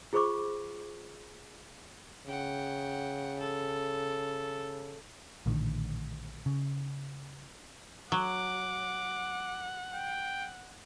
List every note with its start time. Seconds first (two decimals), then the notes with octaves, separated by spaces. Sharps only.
0.13 F4 G#4 C5 B5 C#6 D6
2.27 C#3 F#5 G5
3.40 A4
5.46 A#1 A2 D3 D#3
6.46 C#3
8.12 F#3 F#5 D6
9.94 G5